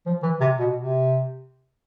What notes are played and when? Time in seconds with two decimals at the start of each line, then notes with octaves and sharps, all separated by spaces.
0.06 F3
0.23 E3
0.40 C3
0.59 B2
0.76 C3